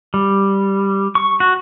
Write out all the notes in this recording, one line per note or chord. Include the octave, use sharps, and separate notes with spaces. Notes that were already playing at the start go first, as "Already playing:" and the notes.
G3
C#6
F#4